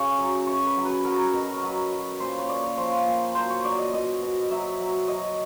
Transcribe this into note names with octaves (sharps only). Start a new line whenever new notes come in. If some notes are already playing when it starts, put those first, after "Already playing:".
Already playing: C#3 C#5
F#3
F#2 C#5
B4
F#3
B4
F#3 A#4
B2
A#4
F#3 B4
F#3
B4
A#2 C5
C#5
A#2 D5
C#5
F3 C5
A#2
F#3 C5
C#5
F#3 D5
D#5
B2 D#5
B2
F#3 E5
F#3
F#3 D#5